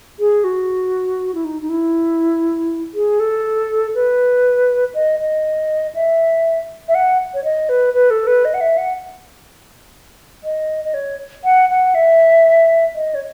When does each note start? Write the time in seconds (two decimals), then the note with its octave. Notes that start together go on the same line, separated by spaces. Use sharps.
0.19 G#4
0.44 F#4
1.35 E4
1.44 D#4
1.62 D#4
1.69 E4
2.94 G#4
3.20 A4
3.95 B4
4.94 D#5
5.20 D#5
5.95 E5
6.88 E5
6.95 F#5
7.34 C#5
7.44 D#5
7.69 B4
7.94 B4
8.10 A4
8.27 B4
8.45 D#5
8.54 F#5
8.61 E5
8.78 F#5
10.44 D#5
10.85 D#5
10.94 C#5
11.44 F#5
11.70 F#5
11.95 E5
12.95 D#5
13.15 C#5